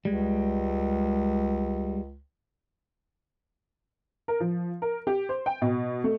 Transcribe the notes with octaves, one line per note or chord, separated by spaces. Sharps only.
C#2 G3 G#3
A#4
F3
A#4
G4
C5
G5
B2
A3